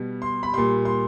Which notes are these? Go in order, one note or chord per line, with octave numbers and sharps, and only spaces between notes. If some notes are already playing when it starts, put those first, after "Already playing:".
Already playing: B2 G3
C6
B5
A#2 G3 C6
C6